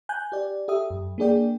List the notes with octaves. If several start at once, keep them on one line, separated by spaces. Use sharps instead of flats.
G#5 F#6 G6
G4 D5
G4 A4 E5 D#6
F#2
A#3 D4 G#4 D5 G5